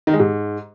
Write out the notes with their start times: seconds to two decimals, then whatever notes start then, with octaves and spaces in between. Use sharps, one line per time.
0.07 D#3
0.13 G#3
0.20 G#2